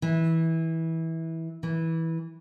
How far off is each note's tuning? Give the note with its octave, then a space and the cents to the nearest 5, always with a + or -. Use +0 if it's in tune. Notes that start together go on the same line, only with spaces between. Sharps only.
E3 -20
E3 -15